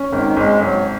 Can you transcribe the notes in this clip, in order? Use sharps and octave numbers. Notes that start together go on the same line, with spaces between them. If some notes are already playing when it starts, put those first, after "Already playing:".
Already playing: C#4
G#1 D#3
G#1 G#3
G#1 F#3